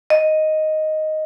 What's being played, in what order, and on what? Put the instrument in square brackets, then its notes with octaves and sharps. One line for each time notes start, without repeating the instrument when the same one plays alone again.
[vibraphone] D#5